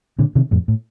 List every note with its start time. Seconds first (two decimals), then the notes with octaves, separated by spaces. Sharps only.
0.19 A#2 D3
0.35 C3 D#3
0.51 F2 A2
0.68 A2